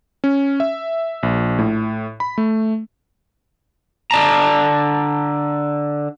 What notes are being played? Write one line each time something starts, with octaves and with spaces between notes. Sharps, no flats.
C#4
E5
A#1
A2
B5
A3
D3 D5 A5 A#5